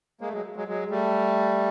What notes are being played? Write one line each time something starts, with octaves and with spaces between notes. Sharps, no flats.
G#3 A#3
A3
F#3 G#3
F#3 G#3
F#3 G#3
G3 A3